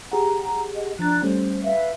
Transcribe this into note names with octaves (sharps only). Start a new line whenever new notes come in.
G4 G#4 F#5 A#5
D#5
F3 D4 A#5 F#6 A6
G3 A3 C#4 C5
B4 E5 F5